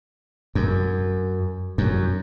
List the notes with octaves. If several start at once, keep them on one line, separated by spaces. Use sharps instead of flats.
F#2
F#2